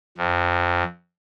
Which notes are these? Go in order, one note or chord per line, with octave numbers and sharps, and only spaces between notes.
F2